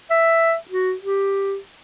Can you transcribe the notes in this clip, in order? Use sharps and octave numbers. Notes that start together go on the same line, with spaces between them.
E5
F#4
G4